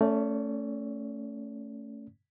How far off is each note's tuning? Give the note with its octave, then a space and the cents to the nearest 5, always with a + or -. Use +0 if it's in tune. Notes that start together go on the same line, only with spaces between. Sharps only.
A3 +10 C#4 +0 D5 -35